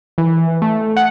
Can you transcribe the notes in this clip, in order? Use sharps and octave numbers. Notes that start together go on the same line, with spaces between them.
E3
A3
F#5